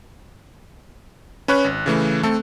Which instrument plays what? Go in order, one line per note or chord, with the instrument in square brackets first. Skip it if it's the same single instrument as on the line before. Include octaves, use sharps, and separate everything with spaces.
[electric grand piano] C#4 B4 C#5 F#6
G#1
C#3 E3 A3
A3 C4 A4